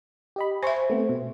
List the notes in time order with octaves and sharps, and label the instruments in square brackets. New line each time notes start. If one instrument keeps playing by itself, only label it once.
[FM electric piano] G4 D#5 B5
[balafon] C5 E5 [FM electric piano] G#5 C6 C#6
[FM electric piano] A3 B3 C4
B2